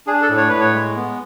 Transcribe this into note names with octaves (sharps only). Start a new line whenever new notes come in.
D4 G#4
A4
A2
C#5
A2 B4
C#5
G#3
B3